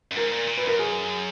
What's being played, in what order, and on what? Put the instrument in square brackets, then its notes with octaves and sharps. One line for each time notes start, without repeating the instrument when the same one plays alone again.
[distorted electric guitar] F#2
[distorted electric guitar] G#2 [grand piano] A#4
[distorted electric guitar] A#2
A#2
[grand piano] B4
[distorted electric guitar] F#2 [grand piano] A#4
[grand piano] G#4